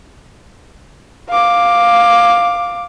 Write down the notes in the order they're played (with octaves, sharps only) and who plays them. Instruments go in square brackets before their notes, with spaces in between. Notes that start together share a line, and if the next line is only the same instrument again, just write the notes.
[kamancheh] F5 D6